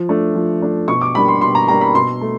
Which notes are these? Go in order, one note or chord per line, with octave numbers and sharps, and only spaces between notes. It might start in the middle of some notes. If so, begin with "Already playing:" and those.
Already playing: F3
A3 D4
F3
A3 D4
B2 C#6
D6
G3 A#3 D4 B5
C6
B2 C6
A#5
G3 A#3 D4 A#5
B5
B2 C6
A3